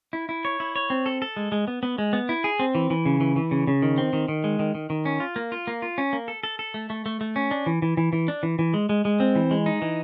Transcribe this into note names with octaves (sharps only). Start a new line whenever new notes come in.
E4
E4
C#5
E4
C#5
C4
A4
A4
G#3
G#3
B3
B3
G#3
B3
E4
G#4
C4
E3
E3
C#3
E3
E3
C#3
C#3
D#3
C4
D#3
D#3
G#3
D#3
D#3
D#3
C#4
F4
A#3
F4
A#3
F4
C#4
A#3
A4
A4
A4
A3
A3
A3
A3
C#4
D4
E3
E3
E3
E3
D4
E3
E3
G#3
G#3
G#3
C4
E3
G#3
D#4
E3